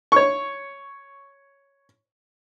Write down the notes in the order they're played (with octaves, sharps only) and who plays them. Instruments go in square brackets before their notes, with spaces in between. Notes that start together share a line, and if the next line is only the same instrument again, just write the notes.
[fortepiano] C#5 C#6